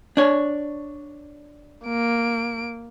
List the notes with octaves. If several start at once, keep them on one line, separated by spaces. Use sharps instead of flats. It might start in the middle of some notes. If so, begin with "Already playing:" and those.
D4 C#5
A#3 D7